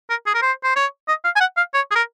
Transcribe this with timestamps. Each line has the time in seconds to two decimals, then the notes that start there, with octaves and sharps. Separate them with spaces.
0.10 A#4
0.26 G#4
0.34 A#4
0.42 C5
0.64 C5
0.76 C#5
1.08 D#5
1.24 F5
1.36 G#5
1.40 F#5
1.57 F5
1.74 C#5
1.91 G#4
1.95 A#4